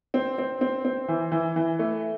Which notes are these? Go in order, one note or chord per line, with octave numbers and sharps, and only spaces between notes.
C4
C4
C4
C4
E3
E3
E3
A3